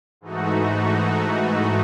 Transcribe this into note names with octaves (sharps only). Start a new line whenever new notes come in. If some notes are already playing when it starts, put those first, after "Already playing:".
G#2 E3 A3 D#4 F#4